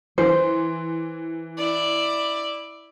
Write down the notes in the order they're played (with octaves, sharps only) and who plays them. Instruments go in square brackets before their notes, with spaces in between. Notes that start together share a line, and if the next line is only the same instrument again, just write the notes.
[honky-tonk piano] E3 [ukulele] C5
[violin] E4 D5